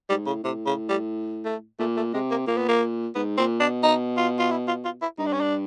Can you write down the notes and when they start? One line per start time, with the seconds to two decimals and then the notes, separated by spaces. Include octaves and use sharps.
0.09 G#2 G3
0.27 A2 C#3
0.44 A2 C3
0.66 C#3
0.89 G3
1.45 A3
1.79 A#2 A3
1.97 A3
2.13 C3 G#3
2.31 A#3
2.47 A#2 A#3
2.57 B3
2.68 A#3
3.15 G#2 B3
3.37 A#2 C4
3.60 B2 D4
3.83 D#4
4.17 F4
4.39 F4
4.51 E4
4.68 F4
4.85 F4
5.02 E4
5.18 G2 D#4
5.26 D4
5.33 C#4
5.41 D4